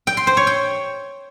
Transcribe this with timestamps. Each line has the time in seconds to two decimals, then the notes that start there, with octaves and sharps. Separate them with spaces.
0.07 G5
0.17 C6
0.27 C5
0.37 C#5
0.47 G5